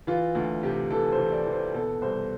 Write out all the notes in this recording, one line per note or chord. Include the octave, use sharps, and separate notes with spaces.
E3 F4
D2 F4
C3 G4
E3 A4
C5
E3
D5
E3
C5
B2 A4
C2 C5